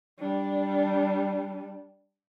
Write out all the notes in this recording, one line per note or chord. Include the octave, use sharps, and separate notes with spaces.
G3 D4